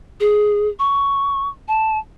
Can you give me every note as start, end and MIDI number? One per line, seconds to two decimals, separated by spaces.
0.20 0.68 68
0.79 1.49 85
1.68 1.98 81